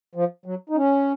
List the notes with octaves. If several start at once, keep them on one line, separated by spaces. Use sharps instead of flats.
F3
F#3
D#4
C#4